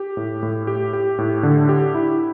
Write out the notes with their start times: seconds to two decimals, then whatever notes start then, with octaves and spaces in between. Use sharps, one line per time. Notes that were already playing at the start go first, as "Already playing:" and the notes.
Already playing: G4
0.17 A2
0.43 A2
0.67 G4
0.93 G4
1.18 A2
1.43 D3
1.69 G4
1.94 E4